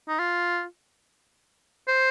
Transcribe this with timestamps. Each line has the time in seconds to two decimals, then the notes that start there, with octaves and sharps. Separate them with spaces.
0.09 D#4
0.19 F4
1.88 C5